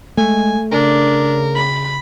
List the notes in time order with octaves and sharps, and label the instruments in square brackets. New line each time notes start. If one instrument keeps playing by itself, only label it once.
[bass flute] G#3 [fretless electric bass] A3 [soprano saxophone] G#5
[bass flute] C#3 [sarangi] D4 [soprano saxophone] A#4
[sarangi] B5